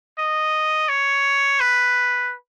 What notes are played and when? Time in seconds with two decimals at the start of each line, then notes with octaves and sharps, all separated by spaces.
0.18 D#5
0.89 C#5
1.60 B4